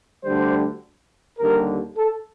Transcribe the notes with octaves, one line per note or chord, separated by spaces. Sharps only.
D2 D3 G3 C5
D#2 D3 G3 A#4
A4